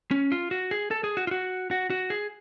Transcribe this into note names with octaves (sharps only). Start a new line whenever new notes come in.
C#4
F4
F#4
G#4
A4
G#4
F#4
F4
F#4
F#4
F#4
G#4